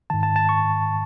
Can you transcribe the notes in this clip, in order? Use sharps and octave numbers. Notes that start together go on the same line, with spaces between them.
G#2 D#3 A5
A5
A5
C#6